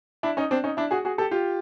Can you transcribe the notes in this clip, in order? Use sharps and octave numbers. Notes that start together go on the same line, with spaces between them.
D4 E4
C#4 D#4
C4 D4
C#4 D#4
D4 E4
F#4 G#4
F#4 G#4
G4 A4
F4 G4